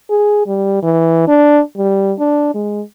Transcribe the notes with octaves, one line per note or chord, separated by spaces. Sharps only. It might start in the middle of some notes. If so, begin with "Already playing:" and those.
G#4
G3
E3
D4
G3
D4
G#3